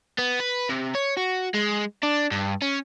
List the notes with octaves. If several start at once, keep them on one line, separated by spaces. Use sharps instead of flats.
B3
B4
C3
C#5
F#4
G#3
D4
G2
C#4